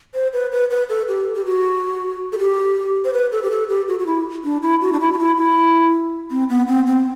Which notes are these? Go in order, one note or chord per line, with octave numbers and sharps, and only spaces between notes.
C5
B4
B4
B4
A4
G4
G4
F#4
A4
G4
C5
B4
A4
G4
A4
G4
F#4
F#4
E4
D4
E4
F#4
D4
E4
F#4
E4
E4
C4
B3
C4
C4